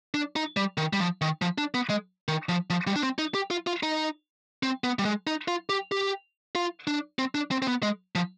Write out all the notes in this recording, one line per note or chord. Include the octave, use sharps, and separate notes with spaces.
D4
D#4
G3
D#3
G3
F3
D#3
F3
D4
B3
G#3
D#3
F3
F3
G3
D4
C4
D#4
G4
F4
F4
D#4
C4
B3
G3
G#3
D#4
F4
G4
G4
F4
D4
C4
D4
C4
C4
B3
G#3
F3